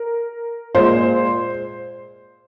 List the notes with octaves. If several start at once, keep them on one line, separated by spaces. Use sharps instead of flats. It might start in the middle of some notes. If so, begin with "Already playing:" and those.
Already playing: A#4
A#2 G#3 C5